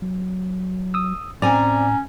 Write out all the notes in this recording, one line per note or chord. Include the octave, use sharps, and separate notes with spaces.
F#3
D#6 E6
A2 C4 C#4 D5 G#5 A#5